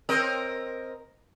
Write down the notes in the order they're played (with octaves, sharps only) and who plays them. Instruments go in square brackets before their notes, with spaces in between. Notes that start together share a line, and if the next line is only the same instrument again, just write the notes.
[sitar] C4 A#4 D#5